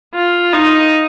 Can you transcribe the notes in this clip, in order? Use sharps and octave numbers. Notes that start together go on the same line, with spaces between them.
F4
D#4